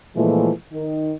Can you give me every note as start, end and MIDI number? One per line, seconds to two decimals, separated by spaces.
0.16 0.51 46
0.16 0.51 52
0.16 0.51 53
0.16 0.51 56
0.16 0.51 57
0.73 1.13 51